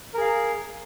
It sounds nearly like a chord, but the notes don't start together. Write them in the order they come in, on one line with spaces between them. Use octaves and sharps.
A#4 G#4 F5